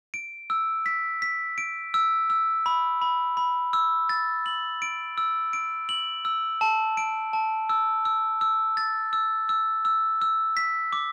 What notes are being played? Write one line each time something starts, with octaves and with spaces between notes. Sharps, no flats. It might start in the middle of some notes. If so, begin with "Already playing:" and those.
D7
E6
B6
B6
D7
E6
E6
B5
B5
B5
E6
A6
F#7
D7
E6
D7
F#7
E6
A5
D7
A5
E6
E6
E6
A6
E6
E6
E6
E6
B6
D6